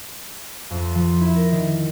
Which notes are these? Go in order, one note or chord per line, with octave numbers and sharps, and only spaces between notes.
F2
F3
E4
A#4
D#3